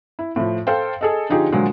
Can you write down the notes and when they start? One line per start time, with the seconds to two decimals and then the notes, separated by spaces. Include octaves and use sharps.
0.19 E4
0.36 A2 F3
0.67 A4 C5 F5 G5
1.01 G#4 A4 D#5
1.29 D3 F3 D#4 F4 G4 G#4
1.52 A#2 D3 F3 F#3 G#3 A#3